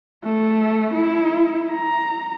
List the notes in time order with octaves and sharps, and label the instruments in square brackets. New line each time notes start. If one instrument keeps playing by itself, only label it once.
[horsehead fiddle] A3
E4
A#5